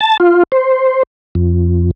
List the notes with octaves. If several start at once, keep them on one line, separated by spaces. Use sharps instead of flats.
A5
F4
C5
F2